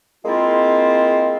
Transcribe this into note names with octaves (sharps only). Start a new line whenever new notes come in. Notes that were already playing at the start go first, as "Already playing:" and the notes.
G#3 A#3 C4 E4 F4